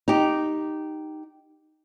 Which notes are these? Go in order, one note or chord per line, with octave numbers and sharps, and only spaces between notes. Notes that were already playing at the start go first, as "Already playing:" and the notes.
D#4 G4